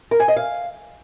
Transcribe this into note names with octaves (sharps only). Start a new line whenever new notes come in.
A#4
G#5
D#5
F5